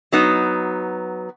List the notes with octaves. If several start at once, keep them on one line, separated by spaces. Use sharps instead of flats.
F#3 B3 D#4